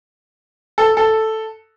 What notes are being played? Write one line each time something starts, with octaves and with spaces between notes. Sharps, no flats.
A4
A4